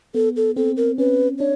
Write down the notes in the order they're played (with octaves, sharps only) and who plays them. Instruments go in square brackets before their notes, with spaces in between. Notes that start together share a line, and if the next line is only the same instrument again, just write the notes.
[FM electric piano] B3 [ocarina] A4
[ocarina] A4
[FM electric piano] C4 [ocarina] A4
[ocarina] A#4
[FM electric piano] C#4 [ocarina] B4
[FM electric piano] D4 [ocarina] C#5